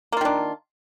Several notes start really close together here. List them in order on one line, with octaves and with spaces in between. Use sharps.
A#3 F4 D#3 D4